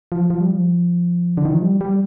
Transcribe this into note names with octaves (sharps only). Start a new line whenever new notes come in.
F3
F3
G3
F3
D3
D#3
F3
G3
G3